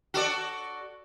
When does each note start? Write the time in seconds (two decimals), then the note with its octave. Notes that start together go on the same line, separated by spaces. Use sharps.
0.14 F#4 A4 D5